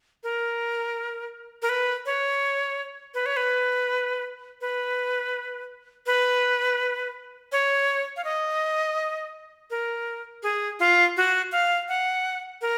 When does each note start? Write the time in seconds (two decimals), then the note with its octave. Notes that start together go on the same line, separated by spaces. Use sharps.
0.23 A#4
1.62 A#4
1.69 B4
2.06 C#5
3.14 B4
3.26 C#5
3.37 B4
4.61 B4
6.06 B4
7.52 C#5
8.16 F5
8.24 D#5
9.70 A#4
10.43 G#4
10.80 F4
11.17 F#4
11.52 F5
11.88 F#5
12.61 A#4